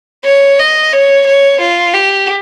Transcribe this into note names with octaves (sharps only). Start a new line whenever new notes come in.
C#5
D#5
C#5
C#5
F4
G4